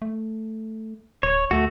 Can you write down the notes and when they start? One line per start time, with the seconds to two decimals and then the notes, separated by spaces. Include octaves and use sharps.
0.02 A3
1.23 D1 C#5
1.51 D2 A3 F#4